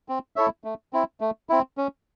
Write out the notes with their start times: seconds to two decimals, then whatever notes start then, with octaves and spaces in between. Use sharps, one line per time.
0.09 C4
0.36 E4 A4 C#5 E5
0.64 A3
0.93 C4 E4
1.21 A3
1.49 C4 E4
1.77 C#4